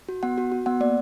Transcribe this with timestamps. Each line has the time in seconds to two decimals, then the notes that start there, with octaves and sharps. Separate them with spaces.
0.09 F#4
0.23 B3 F#5
0.38 F#4
0.52 F#4
0.66 B3 F#5
0.80 A#3 D5